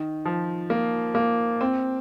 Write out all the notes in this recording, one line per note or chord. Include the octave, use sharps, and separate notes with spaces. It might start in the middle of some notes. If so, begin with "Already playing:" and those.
Already playing: D#3
F3
A#3
A#3
C4